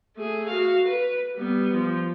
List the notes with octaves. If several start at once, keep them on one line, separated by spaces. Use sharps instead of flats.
A3 G#4
F#4 F5
B4
G3 B3
F3